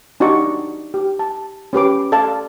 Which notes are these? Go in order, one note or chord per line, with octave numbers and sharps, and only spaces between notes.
D4 D#4 F#4 G4 D5 C#6
G4
A5
C#4 G4 B4 D6
A4 D5 F5 A5